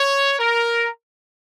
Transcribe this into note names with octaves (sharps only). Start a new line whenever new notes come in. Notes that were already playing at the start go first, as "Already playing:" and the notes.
Already playing: C#5
A#4